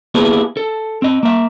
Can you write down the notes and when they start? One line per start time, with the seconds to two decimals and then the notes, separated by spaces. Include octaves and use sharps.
0.15 A#3 B3 E4 G4 G#4 B4
0.57 A4
1.02 C4 D#5
1.23 A#3 E5